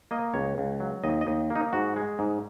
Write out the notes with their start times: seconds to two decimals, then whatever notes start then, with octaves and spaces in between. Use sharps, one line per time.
0.11 A#3 D#5
0.34 C#2 C#5
0.58 C#2
0.80 F#3
1.04 D#2 D#5
1.21 D#5
1.27 D#2
1.50 A#3
1.55 D#4
1.73 G#2 F#4
1.96 G#3
2.19 G#2